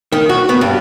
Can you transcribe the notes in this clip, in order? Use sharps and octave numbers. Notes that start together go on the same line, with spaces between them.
D#3
F#4
B3
G2